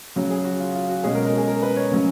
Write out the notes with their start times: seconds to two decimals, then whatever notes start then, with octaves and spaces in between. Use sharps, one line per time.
0.16 C#3 F#3 C#4 F#4
0.30 G#4
0.45 F#4
0.60 F4
0.75 F4
0.89 F#4
1.04 B2 G#3 C#4 G#4
1.15 A#4
1.26 A#4
1.37 G#4
1.48 A#4
1.62 B4
1.77 C#5
1.91 C#3 F#3 C#4